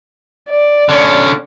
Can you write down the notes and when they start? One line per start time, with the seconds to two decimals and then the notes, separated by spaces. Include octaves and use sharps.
0.50 D5
0.89 D3 C#4